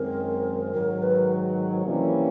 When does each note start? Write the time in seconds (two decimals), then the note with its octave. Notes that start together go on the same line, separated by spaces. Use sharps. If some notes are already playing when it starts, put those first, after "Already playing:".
Already playing: F#2 D#3 G#3 C4 A#4
0.73 G#2 D#3 F#3 A#4
1.03 B4
1.86 C3 E3 G3 A#3 C#4